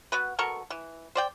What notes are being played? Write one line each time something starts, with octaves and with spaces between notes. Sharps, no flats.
B3 F#4 B4
B2 A4 A#4 C#6
E3
C5 D5 G5